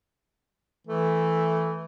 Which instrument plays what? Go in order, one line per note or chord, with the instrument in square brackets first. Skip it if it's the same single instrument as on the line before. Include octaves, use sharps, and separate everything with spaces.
[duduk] E3 [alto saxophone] A3